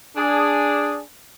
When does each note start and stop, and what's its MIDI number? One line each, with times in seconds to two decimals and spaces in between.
0.16 1.00 62
0.16 1.00 68